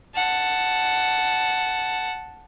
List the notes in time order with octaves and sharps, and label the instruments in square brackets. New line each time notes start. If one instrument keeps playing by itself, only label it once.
[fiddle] F#5 A5